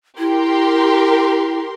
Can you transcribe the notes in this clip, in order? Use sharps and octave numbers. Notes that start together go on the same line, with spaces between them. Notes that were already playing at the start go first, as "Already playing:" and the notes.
E4 G4 A#4 C6